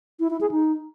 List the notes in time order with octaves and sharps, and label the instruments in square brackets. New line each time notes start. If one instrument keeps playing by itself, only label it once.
[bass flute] E4
E4
G#4
D#4